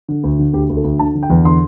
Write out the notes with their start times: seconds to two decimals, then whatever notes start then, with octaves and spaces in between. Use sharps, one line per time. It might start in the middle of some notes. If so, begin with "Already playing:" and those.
0.09 D3
0.24 D2
0.39 D3
0.53 D2 G4
0.69 D2
0.77 A4
0.84 D2
0.99 D3 A5
1.15 D3
1.23 G5
1.30 E2
1.44 D3 C6